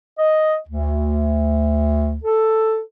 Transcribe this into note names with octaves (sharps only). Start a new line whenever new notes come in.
D#5
D2
A4